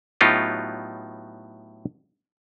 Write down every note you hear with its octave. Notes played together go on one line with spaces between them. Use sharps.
A2 F#3 B3 D#4 F4 G4